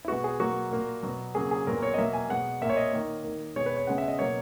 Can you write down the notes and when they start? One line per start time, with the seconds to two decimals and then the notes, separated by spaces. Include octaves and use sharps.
0.05 E4
0.08 B2 G#3 B3 F#4
0.24 G#4
0.39 B2 F#3 A#3 F#4
0.71 A#2 A#3
1.03 B2 F#3 B3
1.35 C#3 F#3 A#3 G#4
1.51 G#4
1.67 A#2 F#3 B3 A#4
1.82 C#5
1.94 D#5
1.97 B2 F#3 A#3 E5
2.13 G#5
2.29 B2 G#3 B3 F#5
2.61 A#2 A#3 E5
2.70 C#5
2.77 D#5
2.93 D#3 A#3
3.24 D#3 A#3
3.56 B2 G#3 B3 C#5
3.66 B4
3.77 C#5
3.87 C#3 G#3 B3 F#5
3.98 E5
4.08 D#5
4.19 B2 F#3 A#3 C#5